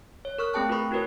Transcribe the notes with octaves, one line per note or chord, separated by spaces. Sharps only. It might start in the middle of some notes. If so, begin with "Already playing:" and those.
C#5
A#4 C#6 F6 F#6
A3 C4 G#4 G5 A5 F#6
F4 G#4 A#4 B4 B5 C#6
E4 F#4 A#4 B4 C#5